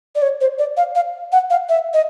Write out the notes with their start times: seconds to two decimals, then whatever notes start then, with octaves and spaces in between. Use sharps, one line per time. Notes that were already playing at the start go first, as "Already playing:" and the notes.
0.15 D5
0.22 C#5
0.41 C5
0.59 D5
0.77 F5
0.95 F5
1.32 F#5
1.50 F5
1.69 E5
1.94 D#5